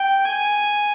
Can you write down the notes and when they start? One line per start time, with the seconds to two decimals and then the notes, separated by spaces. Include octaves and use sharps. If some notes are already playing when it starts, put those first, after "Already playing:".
Already playing: G5
0.25 G#5